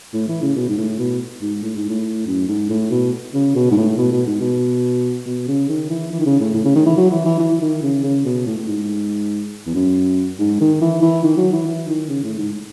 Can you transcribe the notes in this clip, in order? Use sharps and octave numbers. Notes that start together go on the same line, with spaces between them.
A2
E3
C#3
B2
G#2
A2
B2
G#2
A2
G#2
A2
F#2
G#2
A2
B2
C#3
B2
G#2
A2
B2
B2
G#2
B2
B2
C#3
D#3
E3
E3
D#3
C#3
A2
A2
C#3
D#3
E3
F#3
E3
E3
E3
E3
D#3
C#3
C#3
B2
A2
A2
G#2
E2
F#2
G#2
D#3
E3
E3
D#3
F#3
E3
E3
D#3
C#3
A2
G#2